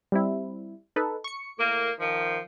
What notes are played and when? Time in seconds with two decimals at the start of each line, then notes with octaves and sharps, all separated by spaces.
0.12 G3 C4 E4
0.96 D#4 A4 B4
1.24 C#6 C#7
1.58 A2 A#3
1.99 D#3 F3